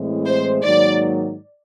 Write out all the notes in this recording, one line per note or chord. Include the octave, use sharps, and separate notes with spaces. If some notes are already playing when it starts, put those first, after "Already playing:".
Already playing: A2 E3 G#3 C4 E4
C5
G#2 D#3 F#3 A#3 D#4 D5